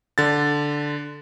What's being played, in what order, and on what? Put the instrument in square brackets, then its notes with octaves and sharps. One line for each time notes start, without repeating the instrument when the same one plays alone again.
[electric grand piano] D3 A6